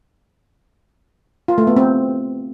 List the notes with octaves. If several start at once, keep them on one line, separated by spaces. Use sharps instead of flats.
F4
A3
B3
C4